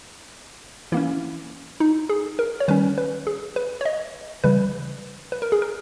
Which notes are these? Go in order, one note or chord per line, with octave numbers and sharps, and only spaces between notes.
E3 A#3 C#4 E4
D#4
G#4
A#4
C#5
D#3 G3 C#4 B4
B4
G#4
B4
C#5
D#5
C#3 E3 G3 B4
B4
A#4
G#4
A#4